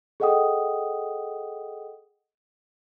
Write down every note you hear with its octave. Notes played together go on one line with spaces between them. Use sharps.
G#4 A4 D#5 F#5 G5 D#6